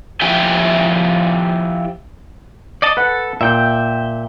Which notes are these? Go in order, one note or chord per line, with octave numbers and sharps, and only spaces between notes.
F3 E4 G4 E5 G5 G#5
D5 D#5 A5
A4 B4 F#5
A#2 E5 G5 G6